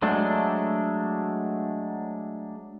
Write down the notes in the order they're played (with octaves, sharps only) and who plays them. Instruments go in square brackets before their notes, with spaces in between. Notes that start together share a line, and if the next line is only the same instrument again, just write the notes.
[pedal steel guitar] F#3 G#3 A3 D4